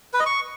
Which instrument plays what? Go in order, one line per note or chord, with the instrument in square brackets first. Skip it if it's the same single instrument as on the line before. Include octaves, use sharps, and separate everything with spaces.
[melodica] B4
D#5
C#6